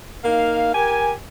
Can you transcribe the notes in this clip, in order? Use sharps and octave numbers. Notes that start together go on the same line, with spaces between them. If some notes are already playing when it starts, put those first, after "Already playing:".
A#3 D#4 F5
G4 A#4 G#5